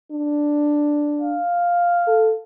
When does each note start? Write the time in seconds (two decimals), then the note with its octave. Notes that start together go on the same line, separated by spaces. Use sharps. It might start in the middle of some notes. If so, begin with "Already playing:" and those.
0.11 D4
1.22 F5
2.07 A4